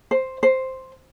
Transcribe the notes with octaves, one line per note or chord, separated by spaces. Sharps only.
C5
C5